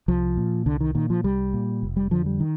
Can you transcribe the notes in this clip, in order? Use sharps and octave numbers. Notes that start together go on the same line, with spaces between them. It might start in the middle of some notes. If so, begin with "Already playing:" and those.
C2 F3
A#2
C2 D3
D#3
A#2 D#3
F3
C2 G3
A#2
F1
G3
F2 D3 F3
G3
D#3